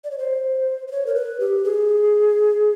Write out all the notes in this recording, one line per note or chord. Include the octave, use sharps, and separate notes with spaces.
D5
C#5
C5
C5
C#5
A#4
B4
G4
G#4